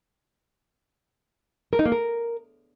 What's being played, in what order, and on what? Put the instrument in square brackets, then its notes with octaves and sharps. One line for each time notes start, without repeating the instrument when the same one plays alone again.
[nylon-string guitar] A#4
D#4
A#3
A#4